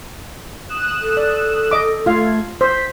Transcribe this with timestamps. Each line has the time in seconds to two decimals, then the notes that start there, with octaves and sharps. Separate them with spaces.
0.69 D#6 F#6 E7
1.01 A4
1.17 D5
1.71 D#5 D6
2.06 A3 F4 F5 G#6
2.61 C5 B6